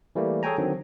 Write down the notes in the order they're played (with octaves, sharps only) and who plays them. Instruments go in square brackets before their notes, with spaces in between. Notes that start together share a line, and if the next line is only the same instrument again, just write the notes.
[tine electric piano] E3 G3 A3 A#3
G#4 A4 C#5 G5 G#5 A#5
D3 D#3 F#3 C4